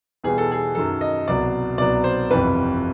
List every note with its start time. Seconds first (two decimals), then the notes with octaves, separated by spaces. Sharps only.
0.24 E2 B2 G3 B3 G#4
0.38 A4
0.51 G#4
0.75 F#2 D#3 F#3 A4
1.01 D#5
1.27 C2 B2 F#3 D5
1.78 C2 B2 F#3 D5
2.04 C5
2.30 G1 F2 C3 E3 G3 B4